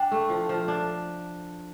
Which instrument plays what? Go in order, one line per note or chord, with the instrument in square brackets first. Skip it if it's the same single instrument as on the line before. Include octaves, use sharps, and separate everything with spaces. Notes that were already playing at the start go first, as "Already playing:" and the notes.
Already playing: [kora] D4 [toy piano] G5
[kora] A3
F3
F3
D4